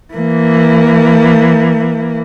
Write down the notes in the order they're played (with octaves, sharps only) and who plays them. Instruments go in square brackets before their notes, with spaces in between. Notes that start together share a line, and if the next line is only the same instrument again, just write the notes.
[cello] E3 A#3